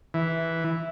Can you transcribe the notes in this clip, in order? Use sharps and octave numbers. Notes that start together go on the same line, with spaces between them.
E3